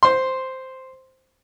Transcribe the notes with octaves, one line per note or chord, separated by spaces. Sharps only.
C5 C6